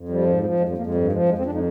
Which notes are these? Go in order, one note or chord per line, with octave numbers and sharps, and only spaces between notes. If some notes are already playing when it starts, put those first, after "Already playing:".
Already playing: F2
F3 G3
G#2
F3
F2 G#3
G3
F2 A#3
G#3
G2 G3
F3 G#3
F2 G#3
C4
F2 D4
D#4